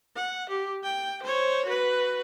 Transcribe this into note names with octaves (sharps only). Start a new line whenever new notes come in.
F#5
G4
G5
C5 C#5
F#4 B4